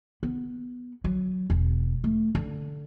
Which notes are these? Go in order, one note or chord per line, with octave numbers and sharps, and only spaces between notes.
B3
F#3
E1
A3
D3